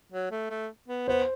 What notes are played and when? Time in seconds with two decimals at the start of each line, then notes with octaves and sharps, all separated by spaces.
0.12 F#3
0.31 A3
0.50 A3
0.88 B3
1.08 B3 C5